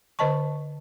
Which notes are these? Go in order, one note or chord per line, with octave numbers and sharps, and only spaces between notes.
D3 C5 D#5 A5 C#6